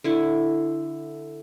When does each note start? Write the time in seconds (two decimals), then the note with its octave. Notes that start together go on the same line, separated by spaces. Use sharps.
0.04 D3 E4